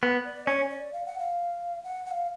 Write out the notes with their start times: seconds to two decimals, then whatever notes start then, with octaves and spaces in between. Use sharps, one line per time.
0.03 B3
0.25 D5
0.47 C#4 C#5
0.70 D5
0.93 F5
1.06 F#5
1.19 F5
1.84 F#5
2.06 F#5
2.11 F5